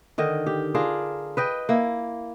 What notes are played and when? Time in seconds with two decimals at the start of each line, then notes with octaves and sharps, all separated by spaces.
0.18 D3 D#3 D#5
0.47 G4
0.74 D4 F4 G#4 A#4
1.37 B4 D#5 G5
1.69 A#3 E4